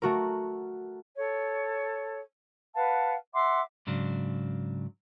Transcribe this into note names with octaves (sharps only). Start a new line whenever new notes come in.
A3 F#4 A#4
A4 C#5
B4 F5 F#5 A5
E5 F#5 C6 D6
G#2 C#3 F#3 D4